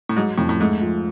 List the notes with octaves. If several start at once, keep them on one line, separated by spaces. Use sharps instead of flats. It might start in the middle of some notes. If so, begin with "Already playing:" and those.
A2
G#2 F#3
F2 A2
A2
G#2 A3
F3